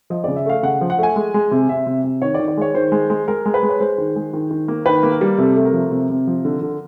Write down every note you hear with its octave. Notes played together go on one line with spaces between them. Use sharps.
F3 D#5
C#3 D5
E5
A3 F5
C#3 F#5
F3
F#5
A3 G#5
G#3
G#3
C3
C3 E5
C3
C3
D#3 C#5
D5
D#3
D5
G#3 C#5
D#3 C5
G#3
G#3
G#3 A#4
G#3
B4
G#3
C#5
G#3 C5
D#3
G#3
D#3
D#3
A#3
D#3 B4
A#3
A#4
G3
C3 A4
A3
A#4
F3
C3
C3
F3
D3
D3